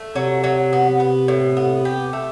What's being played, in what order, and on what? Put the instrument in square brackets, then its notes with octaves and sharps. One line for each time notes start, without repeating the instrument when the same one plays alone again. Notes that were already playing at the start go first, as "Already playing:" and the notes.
Already playing: [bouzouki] A3
[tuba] C3 [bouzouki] F#3
[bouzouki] F#3
B3
B3
A2
B3
G4
A3